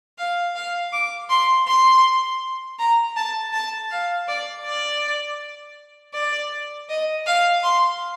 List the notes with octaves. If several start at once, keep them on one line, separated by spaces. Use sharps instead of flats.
F5
F5
D6
C6
C6
A#5
A5
A5
F5
D5
D5
D5
D#5
F5
C6